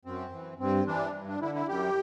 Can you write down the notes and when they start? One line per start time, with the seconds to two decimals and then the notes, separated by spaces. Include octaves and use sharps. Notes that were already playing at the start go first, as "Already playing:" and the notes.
0.05 F#2 C4
0.32 E3
0.59 G2 C4
0.87 E3 D4
1.14 G2
1.28 D4
1.41 D3 E4
1.55 E4
1.68 F#2 G4